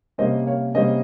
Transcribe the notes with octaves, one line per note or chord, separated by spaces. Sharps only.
C3 G3 A#3 C#4 C5 D#5
C#5 F5
C3 G3 A#3 C#4 C5 D#5